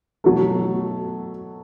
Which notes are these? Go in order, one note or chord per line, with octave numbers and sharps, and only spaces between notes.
B2 F#3 A3 A4